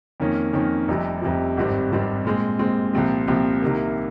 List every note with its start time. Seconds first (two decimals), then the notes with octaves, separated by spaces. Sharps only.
0.20 F2 D#3 A#3 C#4
0.53 F2 D#3 A#3 C#4
0.88 F1 F2 C3 G3
1.22 F1 F2 C3 G3
1.57 G#1 G2 G3 C4
1.91 G#1 G2 G3 C4
2.25 A#2 G#3 C4
2.59 A#2 G#3 C4
2.93 C2 A#2 F3 C4 G4
3.28 C2 A#2 F3 C4 G4
3.62 C2 C3 D#3 A#3